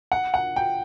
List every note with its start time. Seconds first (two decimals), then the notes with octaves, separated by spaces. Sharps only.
0.12 F#5
0.34 F#5
0.56 G5